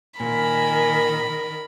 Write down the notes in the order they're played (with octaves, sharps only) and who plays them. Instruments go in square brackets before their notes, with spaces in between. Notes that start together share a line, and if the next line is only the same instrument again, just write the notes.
[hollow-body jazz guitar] A#2 [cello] D#3 A#4 [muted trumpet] G#5 [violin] B5